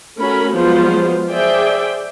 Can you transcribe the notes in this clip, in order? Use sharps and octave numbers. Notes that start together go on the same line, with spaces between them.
A3 C#4 F#4 A#4 B5
F3 F#3 G#3 B3 F4 C5
G#4 C5 D5 E5 G5